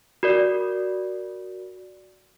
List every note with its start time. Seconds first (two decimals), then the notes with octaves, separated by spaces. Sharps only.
0.23 F#4 A#4 D5